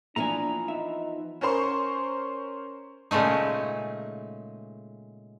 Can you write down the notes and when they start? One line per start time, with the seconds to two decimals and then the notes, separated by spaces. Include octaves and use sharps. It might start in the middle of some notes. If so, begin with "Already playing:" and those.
0.16 E3 F3 A#3 B3 D4 G#5 A#5
0.68 D#4 E5
1.41 C#4 A#4 C5 C6 C#6
3.11 A#2 C#3 G#3 A3 D#4